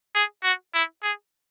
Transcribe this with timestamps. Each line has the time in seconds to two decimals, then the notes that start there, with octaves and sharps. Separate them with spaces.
0.15 G#4
0.43 F#4
0.74 E4
1.03 G#4